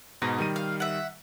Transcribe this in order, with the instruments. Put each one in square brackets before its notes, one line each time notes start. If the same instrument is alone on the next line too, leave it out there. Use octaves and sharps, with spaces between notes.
[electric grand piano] G#2 B2 [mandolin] D#4
[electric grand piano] D#3 G3 D#7
[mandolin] F5
E5 F#5